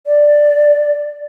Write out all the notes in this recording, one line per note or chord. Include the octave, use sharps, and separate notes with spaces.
D5